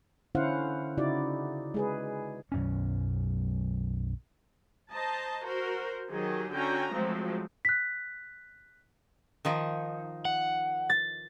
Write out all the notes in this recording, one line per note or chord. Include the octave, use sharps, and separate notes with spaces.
D3 C#4 E4 C5 F5 F#5
C#3 D#4 E4 F#4 D5
G#3 G#4 B4
B1 F#2 C#4
C5 D#5 A5 A#5
F#4 A#4 C5
D#3 F#3 G4 G#4
D3 C#4 F#4 G5 G#5 A#5
F3 F#3 G#3 A3 C4
F#6 B6
D#3 F3 D#4
F#5
A6